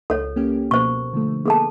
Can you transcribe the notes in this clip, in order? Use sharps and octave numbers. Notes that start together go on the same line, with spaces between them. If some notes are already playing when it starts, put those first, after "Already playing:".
C#2 A4 C#5
A#3 C#4 G4
B2 A#3 C5 C#6
D3 F3 A3
A#3 B3 G#4 A4 A5